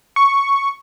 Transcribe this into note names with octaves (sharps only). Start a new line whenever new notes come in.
C#6